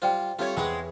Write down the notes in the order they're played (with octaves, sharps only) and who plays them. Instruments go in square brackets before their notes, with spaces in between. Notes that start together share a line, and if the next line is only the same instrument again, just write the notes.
[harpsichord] G3 F4 [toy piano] C5 D5 G5
[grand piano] G3 C4 G4 [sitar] A3 C#5 [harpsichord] F4
[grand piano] E2 E3 B5 [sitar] G#3 [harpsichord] C4 F#5